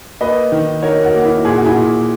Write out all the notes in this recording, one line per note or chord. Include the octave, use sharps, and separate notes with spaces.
A#3 B4 D#5
D#3
D#4 A#4 C#5
F#4 A#4
A#3
E4
A#2 G#4
F#4
E4 G#4
A#2